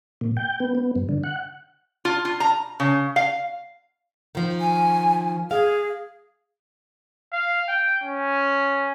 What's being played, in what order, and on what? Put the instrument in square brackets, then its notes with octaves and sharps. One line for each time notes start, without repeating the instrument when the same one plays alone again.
[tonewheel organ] A#2
G5
B3
B3
G2
D3
F#5
[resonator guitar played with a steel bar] F4
F4
A#5
C#3
F5
[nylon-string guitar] D#3 F3
[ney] G#5
[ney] G#4 [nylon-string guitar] F5
[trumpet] F5
G5
C#4